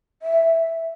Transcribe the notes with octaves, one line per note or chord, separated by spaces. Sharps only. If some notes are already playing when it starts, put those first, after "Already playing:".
E5